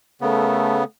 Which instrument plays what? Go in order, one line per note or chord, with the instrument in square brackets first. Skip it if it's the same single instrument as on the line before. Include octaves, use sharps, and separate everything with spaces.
[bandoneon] C#3 B3 [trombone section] A3 A4 A#4